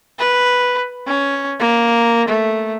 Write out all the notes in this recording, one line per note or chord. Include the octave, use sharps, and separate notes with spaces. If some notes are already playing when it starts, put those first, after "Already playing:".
B4
C#4
A#3
A3